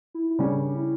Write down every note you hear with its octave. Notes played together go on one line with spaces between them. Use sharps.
E4
E4
C#3 G3 C#4 D4
E4